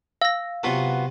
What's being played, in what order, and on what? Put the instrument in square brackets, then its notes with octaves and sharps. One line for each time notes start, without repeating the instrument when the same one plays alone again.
[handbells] F5 [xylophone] E6 A#6
[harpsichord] C3 B4 A5 [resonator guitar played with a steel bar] F#3 B3 F4